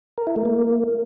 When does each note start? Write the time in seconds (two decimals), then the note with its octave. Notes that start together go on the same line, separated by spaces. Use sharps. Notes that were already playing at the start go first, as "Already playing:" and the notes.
0.18 A#4
0.27 E4
0.36 A3
0.45 A#3